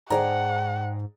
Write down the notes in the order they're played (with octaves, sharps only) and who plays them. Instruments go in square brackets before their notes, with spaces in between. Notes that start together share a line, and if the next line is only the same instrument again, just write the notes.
[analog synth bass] G#2 [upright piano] G#4 D5 A#5 [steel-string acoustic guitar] C5 G5 A5 [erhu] F#5